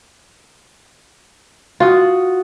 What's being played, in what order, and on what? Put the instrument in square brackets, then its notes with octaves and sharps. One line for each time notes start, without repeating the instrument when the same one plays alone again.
[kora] F4 [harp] F#4 F#5 D#6